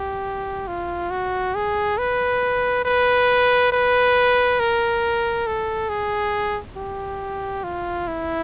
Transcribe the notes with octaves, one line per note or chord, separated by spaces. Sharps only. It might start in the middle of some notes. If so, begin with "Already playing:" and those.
Already playing: G4
F4
F#4
G#4
B4
B4
B4
A#4
A4
G#4
G4
F4
E4